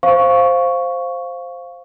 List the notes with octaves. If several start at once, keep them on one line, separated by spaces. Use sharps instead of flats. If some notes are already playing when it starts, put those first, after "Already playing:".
C5 F5 C#6